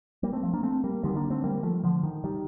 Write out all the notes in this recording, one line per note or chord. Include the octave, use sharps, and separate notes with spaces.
G3 A#3
A3 C4
F3 A3
A#3 D4
A3 C4
G3 A#3
D2 D3 D#3 G3
A#3 D4
A3 C4
G3 A#3
F3 A3
D3 F3
D#3
D#3 G3